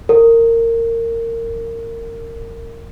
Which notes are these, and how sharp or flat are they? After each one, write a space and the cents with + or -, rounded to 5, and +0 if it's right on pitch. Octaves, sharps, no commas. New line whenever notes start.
A#4 -25